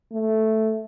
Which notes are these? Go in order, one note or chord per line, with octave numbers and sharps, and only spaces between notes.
A3